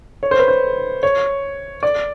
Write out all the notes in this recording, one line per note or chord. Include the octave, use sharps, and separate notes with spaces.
C#5
C5
B4
C5
C#5
D5